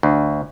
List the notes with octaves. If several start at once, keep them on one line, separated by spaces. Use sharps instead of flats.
D2